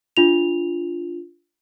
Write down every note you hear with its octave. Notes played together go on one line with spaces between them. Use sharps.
D4 F4 F7